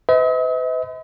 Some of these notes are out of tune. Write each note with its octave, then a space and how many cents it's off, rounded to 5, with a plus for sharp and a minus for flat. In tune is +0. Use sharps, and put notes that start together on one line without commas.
B4 +45 D#5 +45